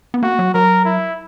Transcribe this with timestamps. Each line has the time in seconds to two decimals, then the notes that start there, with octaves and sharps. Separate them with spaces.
0.14 B3
0.23 A#3 F#4
0.39 F#3
0.54 F#3 A#4
0.85 E4